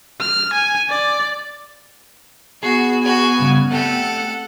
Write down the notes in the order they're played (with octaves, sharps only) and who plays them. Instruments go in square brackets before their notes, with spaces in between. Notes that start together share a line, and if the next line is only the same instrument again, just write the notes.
[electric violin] F6
G#5
D5
[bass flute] B3 [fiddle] F#4 [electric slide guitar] G#4
[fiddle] F#4 G#5
[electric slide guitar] G2 C#3
[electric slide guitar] A3 C4 G4 [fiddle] A4 F#5